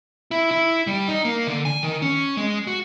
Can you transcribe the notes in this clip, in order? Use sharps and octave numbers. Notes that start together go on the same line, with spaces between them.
E4
E4
G3
D#4
A#3
D3
G#5
D#3
C#4
G#3
F#4